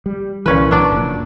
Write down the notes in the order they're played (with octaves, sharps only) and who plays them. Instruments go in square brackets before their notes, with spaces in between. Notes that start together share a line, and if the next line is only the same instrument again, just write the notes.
[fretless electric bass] G3
[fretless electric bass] C2 E3 [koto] A#2 C#4 B4
[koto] F#3 D4 D5
[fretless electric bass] F1 A#2